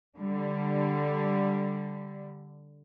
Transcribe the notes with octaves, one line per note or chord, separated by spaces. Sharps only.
D3 G3